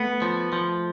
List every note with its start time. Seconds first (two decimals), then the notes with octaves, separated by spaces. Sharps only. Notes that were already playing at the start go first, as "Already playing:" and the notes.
Already playing: A3 B3
0.22 F3
0.53 F3